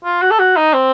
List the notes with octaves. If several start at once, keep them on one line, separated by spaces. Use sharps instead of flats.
F4
F#4
A4
F#4
D#4
C4